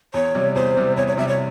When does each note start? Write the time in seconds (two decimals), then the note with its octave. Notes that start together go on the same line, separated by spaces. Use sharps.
0.14 E2 C#5
0.35 C3 G3
0.55 E2 C5
0.77 C3 G3
0.97 E2 C#5
1.07 C#5
1.17 C3 G3 E5
1.28 C#5